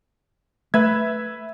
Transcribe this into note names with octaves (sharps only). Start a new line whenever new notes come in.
A3 B4 E5 G#6